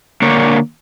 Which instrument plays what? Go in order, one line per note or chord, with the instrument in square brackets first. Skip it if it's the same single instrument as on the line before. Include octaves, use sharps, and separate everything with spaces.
[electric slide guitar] D3 A#3 D4 C#5